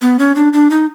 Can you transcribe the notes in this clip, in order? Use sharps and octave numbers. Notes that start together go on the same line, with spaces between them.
B3
C#4
D4
D4
D#4